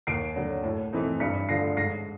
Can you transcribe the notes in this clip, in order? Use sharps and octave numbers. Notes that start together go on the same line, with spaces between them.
D#2 C7 D7
D3 F#3
A2
E3 A3 C4 D#4
G2 B6 C#7
D3 F3 A3 A#6 C7
G#2 A#6 C7